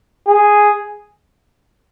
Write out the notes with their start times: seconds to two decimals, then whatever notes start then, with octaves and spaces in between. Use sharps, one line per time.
0.28 G#4